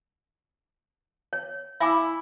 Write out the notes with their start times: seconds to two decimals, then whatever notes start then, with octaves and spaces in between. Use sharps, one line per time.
1.33 C#5
1.81 E4 E5 G#5 D6